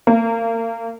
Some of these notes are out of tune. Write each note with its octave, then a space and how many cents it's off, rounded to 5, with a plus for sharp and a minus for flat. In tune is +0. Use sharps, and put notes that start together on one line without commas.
A#3 -35